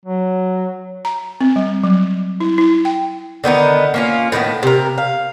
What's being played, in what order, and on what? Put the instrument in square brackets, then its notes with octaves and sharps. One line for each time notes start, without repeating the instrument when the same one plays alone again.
[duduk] F#3
[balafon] A#5
C4
G3
F#3
E4
E4
G5
[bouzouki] D3 D#3 B3 D#4
A#3 C#4 F4
A2 D#3 A#3 B3
C3 A#4
F5